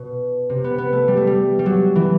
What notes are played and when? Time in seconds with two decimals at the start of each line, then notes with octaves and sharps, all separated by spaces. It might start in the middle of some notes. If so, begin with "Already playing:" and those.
Already playing: B2
0.49 C3
0.64 B3
0.78 B3
0.93 A3
1.08 G3
1.17 A3
1.27 G3
1.59 G3
1.66 F#3
1.96 E3